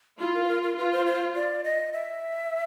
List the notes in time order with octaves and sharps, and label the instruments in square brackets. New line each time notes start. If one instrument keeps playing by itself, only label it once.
[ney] E4 [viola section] F4
[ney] A#4
B4
A#4
A#4
[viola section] F4 [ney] B4
[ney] C5
C5
D5
D#5
E5